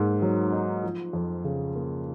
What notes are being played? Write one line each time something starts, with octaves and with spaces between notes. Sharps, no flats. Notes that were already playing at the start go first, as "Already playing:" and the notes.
Already playing: G#2 A#3
F#3
D#4
F3
F2
C#3
A#3